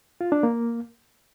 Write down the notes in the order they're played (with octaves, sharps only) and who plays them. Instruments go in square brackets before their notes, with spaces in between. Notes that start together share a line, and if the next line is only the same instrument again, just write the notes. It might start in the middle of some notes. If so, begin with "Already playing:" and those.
[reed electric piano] F4
D4
A#3